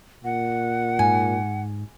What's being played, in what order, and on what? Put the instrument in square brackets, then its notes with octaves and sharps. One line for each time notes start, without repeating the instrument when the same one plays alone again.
[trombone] A#2 [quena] F#5
[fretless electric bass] G#2 [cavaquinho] G#5